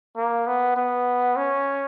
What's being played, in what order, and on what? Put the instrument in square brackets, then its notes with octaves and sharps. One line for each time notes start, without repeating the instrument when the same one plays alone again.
[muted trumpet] A#3
B3
B3
C#4